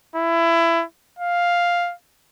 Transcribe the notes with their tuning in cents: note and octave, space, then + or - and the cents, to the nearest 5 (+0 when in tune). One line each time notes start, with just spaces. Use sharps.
E4 +20
F5 +5